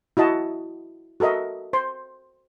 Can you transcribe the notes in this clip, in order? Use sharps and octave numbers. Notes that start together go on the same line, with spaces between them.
E4 F#4 D#5 A5
F#4 A4 A#4 D#5 E5
C5 C6